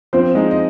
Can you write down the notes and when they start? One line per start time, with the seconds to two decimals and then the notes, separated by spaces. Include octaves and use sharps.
0.13 F3 C4 C5
0.34 G#3 D#4 D#5
0.51 D#5